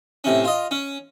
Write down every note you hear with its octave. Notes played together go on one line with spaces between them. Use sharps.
A2 C3 C#4
F4 D#5
C#4